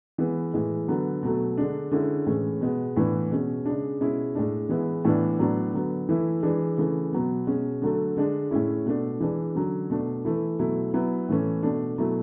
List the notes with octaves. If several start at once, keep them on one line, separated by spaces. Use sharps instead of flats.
E3 G#3 B3
A2 E3 G#3
D3 F#3 B3
B2 F#3 A3
D3 G#3 D4
D3 G#3 C#4 E4
A2 E3 G#3 C#4
B2 G#3 B3
A2 E3 B3 D4
B2 G#3 C#4
C#3 G#3 D4
B2 G#3 C#4 E4
A2 G#3 D4
E3 G#3 B3 E4
A2 E3 B3 D4
A2 F#3 B3 D4
D3 F#3 B3
E3 A3 E4
E3 G#3 D4
C#3 E3 A3
B2 F#3 B3
B2 G#3 C#4
D3 F#3 A3
D3 G#3 D4
A2 G#3 C#4 E4
B2 A3 D4
E3 G#3 D4
D3 F#3 C#4
B2 A3 D4
E3 A3 E4
B2 F#3 A3 E4
F#3 B3 E4
A2 E3 A3 C#4
B2 A3 D4
B2 F#3 A3 E4